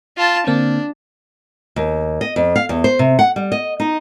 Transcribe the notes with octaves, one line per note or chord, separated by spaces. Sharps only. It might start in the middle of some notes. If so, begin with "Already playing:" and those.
F4 A5
D3 A#3 C4 D4
D#2
D#5
F2
F5
E2
C5
C3
F#5
G3
D#5
D#4